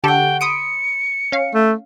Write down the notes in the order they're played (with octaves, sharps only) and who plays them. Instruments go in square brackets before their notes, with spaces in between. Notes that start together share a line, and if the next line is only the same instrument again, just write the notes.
[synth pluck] D3 G4 A4 [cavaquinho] C#5 F#5 [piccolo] G5
[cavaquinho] C5 B5 [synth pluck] D#6 D7 [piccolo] C#7
[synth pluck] C#4 F5
[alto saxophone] A3